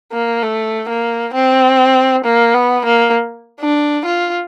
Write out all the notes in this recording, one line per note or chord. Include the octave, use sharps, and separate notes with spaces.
A#3
A3
A#3
C4
A#3
B3
A#3
D4
F4